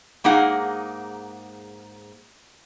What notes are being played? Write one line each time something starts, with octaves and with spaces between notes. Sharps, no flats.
G#2 A#3 D#4 G#4 F#5